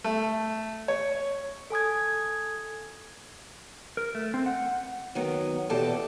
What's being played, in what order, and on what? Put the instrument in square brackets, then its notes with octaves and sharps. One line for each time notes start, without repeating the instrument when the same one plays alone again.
[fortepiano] A3
C#5
[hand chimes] A4 G#5 D#6 G#6
[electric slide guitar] A#4
A3
C4
F#5
[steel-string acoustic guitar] D#3 F#3 B3
E2 B2 G4 A4 D5 A5